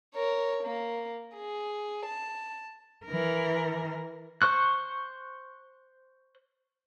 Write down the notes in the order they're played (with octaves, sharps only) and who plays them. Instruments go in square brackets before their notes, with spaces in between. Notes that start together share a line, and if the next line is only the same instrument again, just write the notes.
[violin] A#4 C#5
A#3
G#4
A5
[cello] E3 A#4
[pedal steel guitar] C5 C#6 F#6